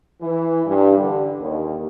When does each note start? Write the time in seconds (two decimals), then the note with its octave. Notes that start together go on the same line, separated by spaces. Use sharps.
0.21 E3
0.66 G2
0.98 D3
1.40 D#2